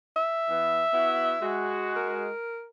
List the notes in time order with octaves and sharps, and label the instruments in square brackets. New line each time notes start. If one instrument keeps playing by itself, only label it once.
[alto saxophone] E5
[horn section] E3 B3
B3 E4 F#4
G#3 F#4
[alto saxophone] A#4